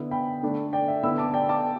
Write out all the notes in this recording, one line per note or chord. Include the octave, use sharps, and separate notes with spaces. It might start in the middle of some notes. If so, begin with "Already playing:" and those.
Already playing: D3 B3 E4
G5 B5
D3 A3 D4
D5 G5
E5
D3 B3 E4 B5 E6
A5 D6
D5 G5
A5 D6